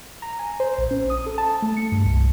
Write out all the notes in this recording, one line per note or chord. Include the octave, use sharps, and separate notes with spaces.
A#5
G#5
C5
A#1
C#4
D#6
A4
A5
A3
C#7
G2
C2